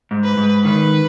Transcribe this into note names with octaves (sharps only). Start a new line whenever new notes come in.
G#2
B4
G#2
D#3 B4